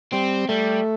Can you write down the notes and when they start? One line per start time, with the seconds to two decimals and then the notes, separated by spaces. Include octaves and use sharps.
0.13 G3 C4
0.49 G3 A3